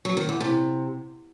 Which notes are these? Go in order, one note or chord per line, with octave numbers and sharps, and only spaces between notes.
F#3
D#3
E2
C3